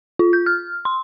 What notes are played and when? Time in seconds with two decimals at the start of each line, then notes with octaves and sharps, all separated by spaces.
0.19 F4
0.33 G6
0.46 F6
0.85 C6